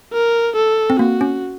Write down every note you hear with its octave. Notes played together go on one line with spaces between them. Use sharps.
A#4
A4
C4
A#3 F#4
C#4